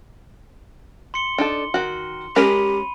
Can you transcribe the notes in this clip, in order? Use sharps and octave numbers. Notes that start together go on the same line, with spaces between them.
C6 C#7 G7
D4 D#4 A4
D#3 F#4
G#3 C#4 G4 A#4 B5 D#7